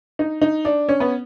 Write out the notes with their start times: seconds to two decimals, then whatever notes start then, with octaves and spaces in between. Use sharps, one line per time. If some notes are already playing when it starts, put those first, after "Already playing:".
0.19 D#4
0.42 D#4
0.65 D4
0.89 C#4
1.00 B3